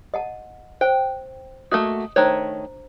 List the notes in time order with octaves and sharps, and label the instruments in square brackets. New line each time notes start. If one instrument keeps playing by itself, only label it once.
[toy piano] D#5 F#5 A5
[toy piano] C5 [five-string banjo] G5
[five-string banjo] A3 A#3 F#4 [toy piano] D#5 D#6
[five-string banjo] D#3 A3 C#5 [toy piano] D4 C5 A#5